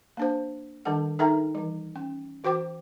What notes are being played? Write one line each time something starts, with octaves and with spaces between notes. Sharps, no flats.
A#3 D4 C5
D#3 G3 D4 A4 F#5
D#4 A4 A#4 E5 G5 A#5
E3 G3
C#4
E3 F#4 C5 G5 D6